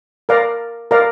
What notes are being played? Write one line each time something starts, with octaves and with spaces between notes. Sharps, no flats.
A#4 D5 F5 A#5
A#4 D5 F5 A#5